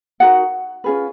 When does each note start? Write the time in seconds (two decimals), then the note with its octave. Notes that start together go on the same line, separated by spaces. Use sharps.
0.20 D#4 F#4 A#4 F#5
0.84 C#4 F4 G#4 B4